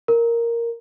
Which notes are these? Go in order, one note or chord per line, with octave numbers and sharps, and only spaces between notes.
A#4